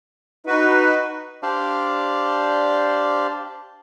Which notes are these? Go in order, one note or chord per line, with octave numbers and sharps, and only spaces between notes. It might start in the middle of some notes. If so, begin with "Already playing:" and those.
D#4 F#4 B4
D4 G4 C5 D5 F5 A5